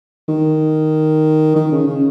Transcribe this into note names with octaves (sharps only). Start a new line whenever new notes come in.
D#3
D#3
C#3
C#3